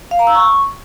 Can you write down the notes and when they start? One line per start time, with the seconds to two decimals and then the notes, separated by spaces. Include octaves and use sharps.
0.11 F5
0.19 A#5
0.27 E6
0.35 C#6